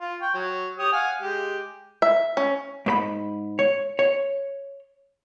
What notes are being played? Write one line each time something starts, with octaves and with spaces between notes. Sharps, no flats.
F4
G5 C#6
F#3
G4 C#5 D#6
F5 F#5 G#5
G#3 G4
E5
C#4
G#2 C5 B5
C#5
C#5